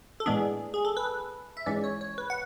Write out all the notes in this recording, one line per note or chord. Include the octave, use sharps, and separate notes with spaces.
A4
A2 E3 G#3 B3 D4 G#4
G#4
A4
B4
E5
G#2 E3 G#3 C#4 D5
C#5
C#5
B4
F#5